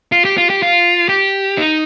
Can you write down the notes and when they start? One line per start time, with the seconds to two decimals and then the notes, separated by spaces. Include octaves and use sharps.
0.12 F4
0.25 G4
0.38 F4
0.50 G4
0.63 F4
1.09 G4
1.58 D#4